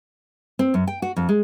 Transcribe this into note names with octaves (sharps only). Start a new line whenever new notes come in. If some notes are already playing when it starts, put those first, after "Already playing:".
C4
F#2
G5
F#4
F2
G#3